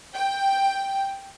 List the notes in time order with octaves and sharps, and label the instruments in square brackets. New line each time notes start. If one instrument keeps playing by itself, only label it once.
[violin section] G5